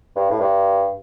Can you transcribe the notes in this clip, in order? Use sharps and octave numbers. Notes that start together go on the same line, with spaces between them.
G2
A2
G2